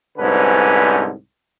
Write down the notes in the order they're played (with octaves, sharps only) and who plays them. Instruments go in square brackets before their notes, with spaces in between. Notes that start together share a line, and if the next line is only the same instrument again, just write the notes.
[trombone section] C2 G#2 D3 C#4 B4